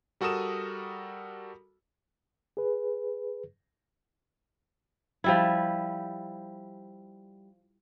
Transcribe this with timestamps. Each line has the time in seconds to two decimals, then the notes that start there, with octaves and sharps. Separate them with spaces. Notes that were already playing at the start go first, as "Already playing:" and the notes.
0.21 G3 F#4 A4 A#4 D#6 E7
2.57 G#4 B4
5.24 F3 G3 E4